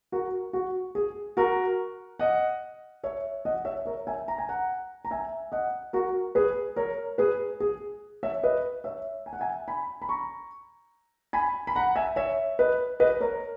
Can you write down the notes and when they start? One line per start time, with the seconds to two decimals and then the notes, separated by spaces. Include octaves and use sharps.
0.12 F#4 A#4
0.53 F#4
0.95 G#4
1.37 F#4 A#4
2.19 D#5 F#5
3.04 C#5 E5
3.45 D#5 F#5
3.65 C#5 E5
3.86 A#4 C#5
4.07 E5 G#5
4.28 A#5
4.38 G#5
4.49 F#5 A#5
5.05 A#5
5.11 E5 G#5
5.52 D#5 F#5
5.93 F#4 A#4
6.35 G#4 B4
6.76 A#4 C#5
7.18 G#4 B4
7.60 G#4
8.23 C#5 E5
8.43 B4 D#5
8.84 C#5 E5
9.26 G#5
9.33 F#5
9.40 E5 G#5
9.68 G#5 B5
10.02 B5
10.09 A#5 C#6
11.33 G#5 B5
11.67 B5
11.75 F#5 A#5
11.95 E5 G#5
12.16 C#5 E5
12.59 B4 D#5
13.00 B4 D#5
13.20 A#4 C#5